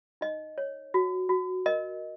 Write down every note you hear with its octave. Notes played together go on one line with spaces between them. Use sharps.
D#4 D#5
C#5
F#4
F#4
A#4 D#5